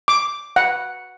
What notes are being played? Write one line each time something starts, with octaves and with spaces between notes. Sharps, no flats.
D6
F#5